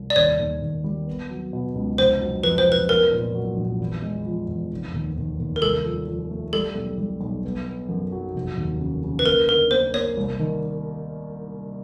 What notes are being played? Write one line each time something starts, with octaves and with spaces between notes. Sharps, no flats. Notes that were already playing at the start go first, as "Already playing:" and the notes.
Already playing: C2
D5
D#2 C#5
D#2
D#2
G3
B3
F#3
B2
C#2
F1 C5
F#3
F2 B4
C5
F1
B4
B3 A#4
A#2
F#3
A#1
E2
G#3
F3
E2
F1
D#2
D#2
D#2
A#4
C2 A4
F3
F3
A3
G3 A4
B1
G3
B1
B3
B3
F#2
F#3
F1
D#2
C#3
C#3
B4
A#3 A#4
D3 A#4
A#3 C5
A#3 C#5
C2
D#3